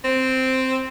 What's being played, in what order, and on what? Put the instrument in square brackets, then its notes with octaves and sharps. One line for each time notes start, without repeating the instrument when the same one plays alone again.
[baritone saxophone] C4